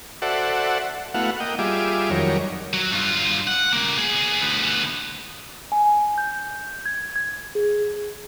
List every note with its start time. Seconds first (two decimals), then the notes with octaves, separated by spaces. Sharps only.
0.22 F#4 A4 C5 D5 E5 F#5
1.14 A3 B3 E4 F#4 F5 F#5
1.40 A#3 D#5 G5
1.59 G3 F4 G#4 E5 D6
2.10 F2 D#3 F#3 G3 A#4 C#5
2.73 F#3
2.92 G2 F4
3.47 F#5
3.73 C#2 A#3
3.97 B3 G#4
4.42 D2 B3
5.72 G#5
6.18 G6
6.86 G#6
7.16 G#6
7.55 G#4